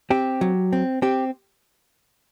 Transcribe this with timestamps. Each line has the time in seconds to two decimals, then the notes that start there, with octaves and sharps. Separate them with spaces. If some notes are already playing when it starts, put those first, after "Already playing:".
0.10 C4 G4
0.41 F#3
0.73 C4
1.02 C4 G4